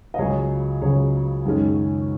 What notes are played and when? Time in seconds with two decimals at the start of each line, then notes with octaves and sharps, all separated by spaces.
0.14 D#5
0.18 C#2 C#3 F#3 G#4 C#5
0.82 C#2 C#3 F#3 G#4 C#5
1.45 F#2 D#3 G#3 C#4